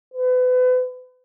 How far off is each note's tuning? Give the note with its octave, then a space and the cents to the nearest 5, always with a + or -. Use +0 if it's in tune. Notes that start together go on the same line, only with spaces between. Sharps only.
B4 +35